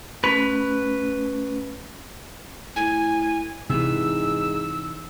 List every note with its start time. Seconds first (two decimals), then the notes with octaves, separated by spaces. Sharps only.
0.24 A3 C#4 B4
2.76 A2 G#5
3.70 G#2 C3 E3 E6